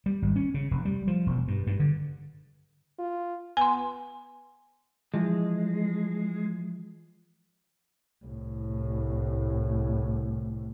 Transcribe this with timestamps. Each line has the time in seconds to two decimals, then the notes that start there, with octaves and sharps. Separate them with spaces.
0.06 G3
0.22 G#1
0.36 C#4
0.54 C#3
0.71 F1
0.85 G3
1.07 F3
1.26 E1
1.48 G2
1.67 G2
1.80 D3
2.99 F4
3.57 B3 G#5 C6
5.14 E3 F3 G#3
8.25 C2 A2